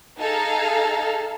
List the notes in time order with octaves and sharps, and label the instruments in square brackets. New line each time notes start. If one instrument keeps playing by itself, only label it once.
[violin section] D#4 G#4 A4 F5 A#5